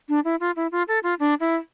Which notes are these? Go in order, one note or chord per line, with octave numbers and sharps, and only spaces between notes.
D4
E4
F4
E4
F4
A4
F4
D4
E4